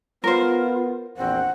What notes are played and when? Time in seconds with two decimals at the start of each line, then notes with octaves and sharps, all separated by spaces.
0.24 B3 F4 A#4 C5
1.17 A#1 E2 C4 F#5